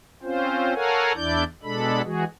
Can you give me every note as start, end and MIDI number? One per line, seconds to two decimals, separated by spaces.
0.23 0.73 60
0.23 0.73 61
0.23 0.73 65
0.23 0.73 72
0.74 1.12 69
0.74 1.12 70
0.74 1.12 73
0.74 1.12 77
0.74 1.12 78
0.74 1.12 80
1.15 1.44 40
1.15 1.44 62
1.15 1.44 64
1.15 1.44 74
1.15 1.44 91
1.63 2.02 47
1.63 2.02 56
1.63 2.02 62
1.63 2.02 69
1.63 2.02 83
2.04 2.24 52
2.04 2.24 56
2.04 2.24 66
2.04 2.24 68